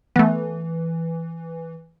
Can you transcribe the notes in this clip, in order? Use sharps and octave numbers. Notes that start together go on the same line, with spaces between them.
E3 A3 B3